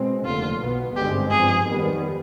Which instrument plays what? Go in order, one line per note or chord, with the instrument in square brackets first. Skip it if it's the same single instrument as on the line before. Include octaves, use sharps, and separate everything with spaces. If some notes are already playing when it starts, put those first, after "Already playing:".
Already playing: [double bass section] B2 G#3 C4
[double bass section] F1 D#2 D3 [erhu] F4
[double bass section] B1 B2 B3
[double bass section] G#1 G2 D3 G#3 C4 [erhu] G4
[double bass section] G2 F3 C4 [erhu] G#4
[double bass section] F2 D#3 G3 B3